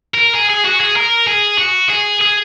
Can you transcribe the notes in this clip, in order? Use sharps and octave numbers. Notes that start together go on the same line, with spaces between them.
A#4
G#4
G#4
F#4
G#4
A#4
G#4
F#4
G#4
G#4